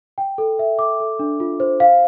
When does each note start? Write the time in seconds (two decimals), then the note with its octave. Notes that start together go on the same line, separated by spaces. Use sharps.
0.18 G5
0.38 A4
0.59 E5
0.79 D6
1.00 A4
1.19 D4
1.40 F4
1.60 C5
1.80 F5